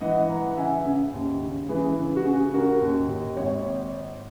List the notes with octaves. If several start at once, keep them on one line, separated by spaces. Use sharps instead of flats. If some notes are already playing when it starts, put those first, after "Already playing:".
E3 D#5 F#5
E3 F#5 A#5
F#5
C#3 E5 G#5
C#3
D#2
C#3
E3 G#4 B4
C#3
F#4
C#3 G#4
C#3 F#4 A#4
D#2
D#2
G#1 C#5